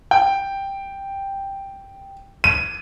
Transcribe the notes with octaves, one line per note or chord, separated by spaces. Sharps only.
G5
D#7